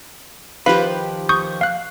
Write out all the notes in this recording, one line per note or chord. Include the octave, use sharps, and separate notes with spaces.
D#3 F3 G4 B4 F5
C#6 D#6 G6
F5 F#6